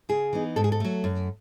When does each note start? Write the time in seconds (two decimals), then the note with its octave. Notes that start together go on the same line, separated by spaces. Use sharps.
0.09 C#3 G#4
0.33 E3 B3 D#4
0.56 G#2 A4
0.64 G#4
0.72 A4
0.80 F#3 A3
1.04 F#2